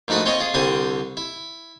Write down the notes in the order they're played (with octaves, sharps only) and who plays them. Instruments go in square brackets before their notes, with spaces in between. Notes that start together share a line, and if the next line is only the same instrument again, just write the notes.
[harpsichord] A#1 G#2 A3 F#4 B5 D#6
C4 C#4 F4 C#5 D#5 G#5
F4 G#4
C2 D3 G3 C4 G#5 D#6
E4